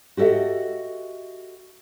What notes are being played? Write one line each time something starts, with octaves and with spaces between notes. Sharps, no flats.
F#4 G4 A4 D#5 E5